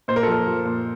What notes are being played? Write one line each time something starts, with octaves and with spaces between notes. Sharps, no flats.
A#2 C5
A#4
A4
F3 A#4
F3
A#2